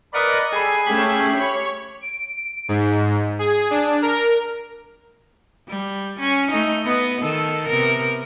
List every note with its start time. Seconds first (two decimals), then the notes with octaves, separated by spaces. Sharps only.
0.14 A#4 B4 D5 D#5 F#5
0.52 G3 G#4 A4 G#5 B5
0.86 A3 C#4 G4 B5
1.35 C#5
2.01 D7
2.69 G#2
3.39 G#4
3.71 D4
4.02 A#4
5.68 G3
6.19 C#4
6.51 A3 D#4
6.83 B3 D#5
7.20 D#3 A4
7.67 C3 B3 A#4